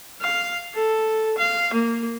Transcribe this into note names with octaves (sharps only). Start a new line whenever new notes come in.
F5
A4
F5
A#3